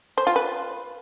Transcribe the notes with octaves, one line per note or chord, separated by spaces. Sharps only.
C5
F4
B4